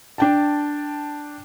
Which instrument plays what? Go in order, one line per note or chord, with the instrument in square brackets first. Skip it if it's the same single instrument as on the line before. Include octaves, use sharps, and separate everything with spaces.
[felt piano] D4 G5 A5